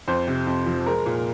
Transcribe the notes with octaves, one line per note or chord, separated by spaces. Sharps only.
F2 C5
C3
F2
F3
G#3 A#4
A#2